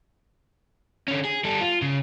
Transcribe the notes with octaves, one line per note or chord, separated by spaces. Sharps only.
D3 C#4
G#4
G3 A4
F4
C#3